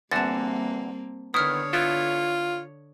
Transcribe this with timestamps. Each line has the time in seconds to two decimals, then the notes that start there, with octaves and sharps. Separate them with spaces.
0.11 E2 D3 G3 A#3 C4 F#4 A5 A6
1.34 D3 D#3 B3 E4 C#5 D#6 F6
1.73 B3 E4 F4 A4